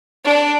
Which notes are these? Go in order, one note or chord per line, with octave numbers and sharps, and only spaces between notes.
D4